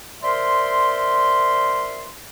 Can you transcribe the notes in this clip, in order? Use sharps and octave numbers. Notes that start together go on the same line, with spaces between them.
A#4 C5 D5 E5 C6